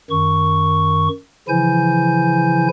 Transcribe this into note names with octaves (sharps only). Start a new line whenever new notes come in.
F#2 D#3 C#6
C#3 E3 F3 E4 G#5 G6